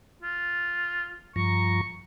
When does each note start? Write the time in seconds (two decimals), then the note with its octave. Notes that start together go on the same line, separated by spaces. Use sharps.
0.22 F4
1.36 G2 F3 A#5 C#6